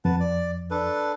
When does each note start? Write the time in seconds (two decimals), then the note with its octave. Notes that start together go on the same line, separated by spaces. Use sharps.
0.05 F2 B4 F#5 A5
0.20 D5
0.71 D4 A4 B4